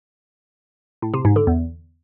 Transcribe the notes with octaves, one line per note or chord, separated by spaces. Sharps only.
A2
C3
G#2
D3
E2